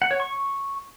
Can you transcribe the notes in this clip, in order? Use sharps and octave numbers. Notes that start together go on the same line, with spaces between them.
F#5
C#5
C#6